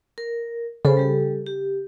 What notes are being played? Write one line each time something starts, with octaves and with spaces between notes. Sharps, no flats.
A#4
C#3 A4 C5 B5
G3 G4 A4
G4